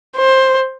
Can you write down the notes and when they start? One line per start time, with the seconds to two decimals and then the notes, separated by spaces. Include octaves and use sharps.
0.17 C5